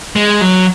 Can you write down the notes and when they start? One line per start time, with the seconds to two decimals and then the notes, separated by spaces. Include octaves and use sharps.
0.16 G#3
0.41 F#3